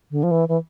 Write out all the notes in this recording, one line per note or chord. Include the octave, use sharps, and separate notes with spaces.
D3
F3
E3
E3